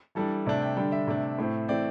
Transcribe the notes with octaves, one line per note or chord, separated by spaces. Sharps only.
E3 G3 D4 A4
C3 A3 D4 D5
G5
D3 G3 D4 G5
E5
C3 A3 D4
A2 A3 C4
E3 A3 C4 D5